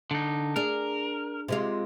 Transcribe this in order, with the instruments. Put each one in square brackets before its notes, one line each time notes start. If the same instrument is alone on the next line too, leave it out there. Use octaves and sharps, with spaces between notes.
[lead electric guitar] D3 D#4
[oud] D4 G#4 [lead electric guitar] A#4
[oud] C3 G#3 F4